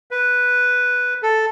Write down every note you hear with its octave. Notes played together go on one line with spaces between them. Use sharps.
B4
A4